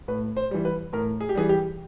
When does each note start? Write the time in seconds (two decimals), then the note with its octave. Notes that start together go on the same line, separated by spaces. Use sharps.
0.08 A2 B4
0.37 C5
0.51 E3 G3
0.65 B4
0.93 A2 A#4
1.20 G#4
1.29 G4
1.35 E3 G3 G#4
1.49 G4